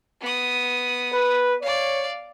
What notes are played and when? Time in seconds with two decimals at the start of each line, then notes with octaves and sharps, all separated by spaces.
0.21 B3 D#6
1.13 B4
1.62 C#5 D5 F5